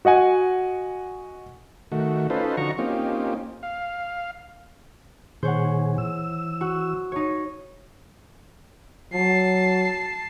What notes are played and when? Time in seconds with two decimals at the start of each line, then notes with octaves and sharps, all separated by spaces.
0.05 F#4 D#5 F#5 G#5
1.92 D#3 A3 F#4
2.30 C#4 D#4 F4 A4 B4 C5
2.57 D3 F3 D#4 F#4 A#5 C#6
2.78 A#3 C4 C#4 D#4 F4 G4
3.63 F5
5.43 A#2 D#3 G#4 C5 C#5 F#5
5.98 E3 E6
6.61 F#4
7.12 D#4 C#5
9.13 F#3 A5 C7